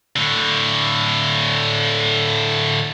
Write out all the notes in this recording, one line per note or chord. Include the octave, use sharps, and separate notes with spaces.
A2 D3